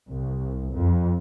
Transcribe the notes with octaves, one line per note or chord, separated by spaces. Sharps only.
C2
F2